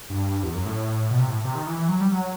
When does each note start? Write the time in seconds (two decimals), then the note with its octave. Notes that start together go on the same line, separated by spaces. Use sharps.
0.10 G2
0.43 E2
0.55 F#2
0.66 A2
1.11 B2
1.19 C3
1.27 A2
1.44 C3
1.55 D#3
1.67 E3
1.77 E3
1.89 F#3
2.00 G3
2.12 F#3